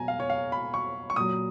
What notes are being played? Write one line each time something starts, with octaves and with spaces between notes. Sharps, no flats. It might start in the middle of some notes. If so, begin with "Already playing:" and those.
Already playing: B2 F#3 G#5 A#5
F5
C#5
F5
B5
C#6
C#6
A#2 F#3 D#6